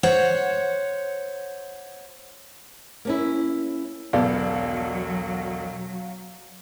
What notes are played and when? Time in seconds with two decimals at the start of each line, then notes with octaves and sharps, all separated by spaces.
0.03 C5 C#5 F#5
3.05 A#3 C#4 E4
4.13 E1 B1 F#3 B3 A4 D5 F5